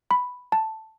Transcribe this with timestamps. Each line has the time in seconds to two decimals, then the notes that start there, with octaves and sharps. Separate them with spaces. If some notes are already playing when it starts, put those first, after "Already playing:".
0.11 B5
0.52 A5